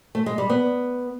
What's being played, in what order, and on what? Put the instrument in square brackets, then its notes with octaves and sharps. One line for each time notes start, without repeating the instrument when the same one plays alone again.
[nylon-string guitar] A3
G#3
G3
B3